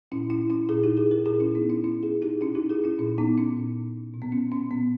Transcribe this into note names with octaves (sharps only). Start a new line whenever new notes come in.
A#2 C#4 E4
C#4 E4
C#4 E4
A#2 E4 G#4
D#4 G4
E4 G#4
G4 A#4
A#2 E4 G#4
C#4 E4
B3 D#4
C#4 E4
A#2 C#4 E4
E4 G#4
D#4 G4
B2 C#4 E4
D#4 G4
E4 G#4
C#4 E4
A#2 C#4
B3 D#4
C#4
A#2
B2
B3
C#4
C#4
A#2 B3